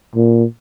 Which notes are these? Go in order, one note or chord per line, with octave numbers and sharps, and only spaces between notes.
A#2